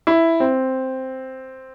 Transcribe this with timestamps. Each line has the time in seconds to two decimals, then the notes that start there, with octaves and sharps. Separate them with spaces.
0.07 E4
0.40 C4